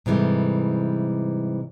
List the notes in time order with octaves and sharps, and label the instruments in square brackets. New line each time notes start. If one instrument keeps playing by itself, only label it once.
[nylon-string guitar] G#2 C3 E3 F#3 G3 A3